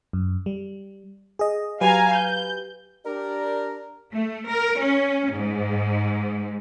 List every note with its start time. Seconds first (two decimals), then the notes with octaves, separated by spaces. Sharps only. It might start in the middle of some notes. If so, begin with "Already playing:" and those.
0.13 F#2
0.46 G3
1.39 G#4 D#5
1.81 F#3 G4 B4 F5 G#5 A#5
2.13 G6
3.06 D4 G4 A#4 D5
4.14 A3
4.50 A#4
4.80 C#4
5.34 G#2